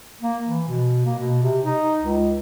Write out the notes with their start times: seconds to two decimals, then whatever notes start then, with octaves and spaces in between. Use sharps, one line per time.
0.21 A#3
0.47 E3
0.68 B2
1.05 A#3
1.19 B2
1.42 C3
1.64 D#4
2.00 C#2